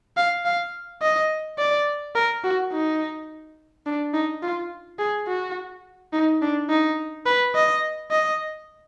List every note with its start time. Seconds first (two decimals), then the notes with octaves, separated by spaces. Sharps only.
0.17 F5
0.45 F5
1.02 D#5
1.58 D5
2.15 A#4
2.44 F#4
2.72 D#4
3.86 D4
4.14 D#4
4.43 F4
4.99 G#4
5.28 F#4
6.13 D#4
6.41 D4
6.69 D#4
7.26 B4
7.55 D#5
8.11 D#5